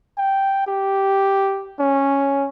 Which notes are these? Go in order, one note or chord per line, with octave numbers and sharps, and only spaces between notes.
G5
G4
C#4